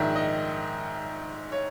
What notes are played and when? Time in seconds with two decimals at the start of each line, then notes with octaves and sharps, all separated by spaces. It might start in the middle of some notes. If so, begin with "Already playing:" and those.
Already playing: A#1 G#2 D#3 E5
0.16 D#5
1.52 C#5